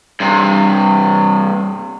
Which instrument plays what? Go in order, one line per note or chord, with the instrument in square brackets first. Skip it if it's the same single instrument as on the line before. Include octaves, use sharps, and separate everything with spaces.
[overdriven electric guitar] G2 C3